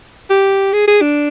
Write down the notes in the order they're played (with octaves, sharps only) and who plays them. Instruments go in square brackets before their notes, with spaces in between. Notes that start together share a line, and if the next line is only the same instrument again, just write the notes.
[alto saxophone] G4
G#4
G#4
D4